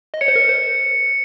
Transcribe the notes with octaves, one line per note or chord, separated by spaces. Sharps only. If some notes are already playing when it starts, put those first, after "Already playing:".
D#5
C#5 C#7
C5
A#4
C5